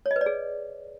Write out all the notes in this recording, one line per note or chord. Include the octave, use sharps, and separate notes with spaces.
C#5
D#5
B4
D5
G#4